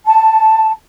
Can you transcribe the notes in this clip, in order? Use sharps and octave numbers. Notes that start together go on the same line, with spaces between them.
A5